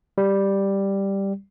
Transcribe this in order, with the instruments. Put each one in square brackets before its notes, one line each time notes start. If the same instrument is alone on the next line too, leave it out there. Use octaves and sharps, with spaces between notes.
[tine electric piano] G3